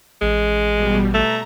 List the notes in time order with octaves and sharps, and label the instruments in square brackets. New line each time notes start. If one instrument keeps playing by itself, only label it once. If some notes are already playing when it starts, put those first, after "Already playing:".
[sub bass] A1 [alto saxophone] G#3
[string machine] B2 G3
[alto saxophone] A3 [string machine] A#5